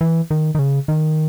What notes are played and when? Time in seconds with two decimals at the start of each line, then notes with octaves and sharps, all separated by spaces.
0.01 E3
0.31 D#3
0.55 D#3
0.59 C#3
0.88 D#3